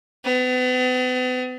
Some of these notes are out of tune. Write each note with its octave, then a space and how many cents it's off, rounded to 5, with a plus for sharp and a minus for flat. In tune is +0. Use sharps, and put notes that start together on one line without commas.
B3 +40